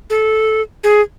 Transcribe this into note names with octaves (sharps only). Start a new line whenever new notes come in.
A4
G#4